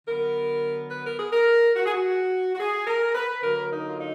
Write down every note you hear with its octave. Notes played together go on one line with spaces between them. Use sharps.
D3 F#3 B3 A#4
B4
A#4
G#4
A#4
F#4
G#4
F#4
F#4
G#4
A#4
B4
D3 F#3 A#3 A#4
D#4
F4
D#4